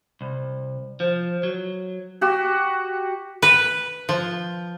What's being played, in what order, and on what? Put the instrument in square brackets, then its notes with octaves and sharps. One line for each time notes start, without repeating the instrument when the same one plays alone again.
[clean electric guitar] C2
F3
F#3
[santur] F#4 G4
[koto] B4
F3